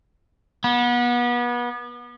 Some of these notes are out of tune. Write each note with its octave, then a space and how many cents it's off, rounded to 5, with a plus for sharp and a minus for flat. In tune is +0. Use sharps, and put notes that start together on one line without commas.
B3 -30